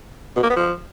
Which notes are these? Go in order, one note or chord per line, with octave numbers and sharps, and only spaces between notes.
B2
A#3
B3
F3